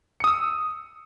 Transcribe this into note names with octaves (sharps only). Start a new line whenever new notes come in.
D#6 E6 C#7